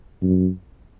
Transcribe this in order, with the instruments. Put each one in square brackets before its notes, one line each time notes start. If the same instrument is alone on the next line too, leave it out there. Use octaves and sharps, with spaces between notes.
[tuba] F#2